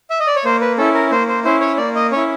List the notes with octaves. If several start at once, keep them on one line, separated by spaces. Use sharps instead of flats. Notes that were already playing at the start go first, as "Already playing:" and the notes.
E5
D#5
D5
C#5
A#3 C5
B4
C#4 E4 A4
A#4
A#3 C5
C5
C#4 E4 C5
C#5
A#3 D5
D#5
C#4 E4 C#5